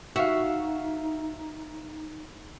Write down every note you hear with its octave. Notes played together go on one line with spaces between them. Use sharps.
D#4 F#4 E5 F5